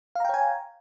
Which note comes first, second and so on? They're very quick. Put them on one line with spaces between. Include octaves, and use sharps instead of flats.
F5 A#5 G5 C#5 G#5